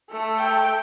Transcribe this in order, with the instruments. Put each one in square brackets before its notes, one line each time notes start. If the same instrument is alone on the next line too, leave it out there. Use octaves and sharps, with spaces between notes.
[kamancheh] A3 A4
[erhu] G5